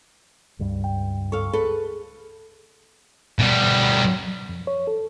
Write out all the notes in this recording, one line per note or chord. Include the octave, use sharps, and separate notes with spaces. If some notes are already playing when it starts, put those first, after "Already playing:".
C#2 G2
G5
A4 F5 C#6
G#4 A4 B4
B2 G3
F2
C#5
A4